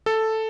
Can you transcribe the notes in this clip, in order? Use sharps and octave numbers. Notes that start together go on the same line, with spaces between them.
A4